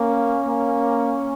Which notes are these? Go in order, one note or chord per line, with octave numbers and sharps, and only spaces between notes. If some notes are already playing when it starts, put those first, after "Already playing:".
Already playing: A#3 C#4
A#3